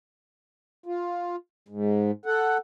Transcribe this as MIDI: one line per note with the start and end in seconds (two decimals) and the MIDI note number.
0.86 1.36 65
1.68 2.11 44
2.26 2.57 69
2.26 2.57 78